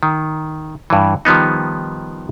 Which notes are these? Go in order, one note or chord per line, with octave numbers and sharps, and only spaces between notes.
D#3
G2 E3
D#3 F3 G3 B3 D#4